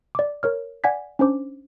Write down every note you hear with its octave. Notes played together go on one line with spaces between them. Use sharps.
D5 D6
A#4 C#5 F6
D5 F#5 G#5 G#6 B6
C#4 D4 C5 D6